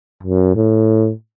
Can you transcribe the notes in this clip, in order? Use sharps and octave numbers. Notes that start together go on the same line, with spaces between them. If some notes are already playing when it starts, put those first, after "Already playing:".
F#2
A2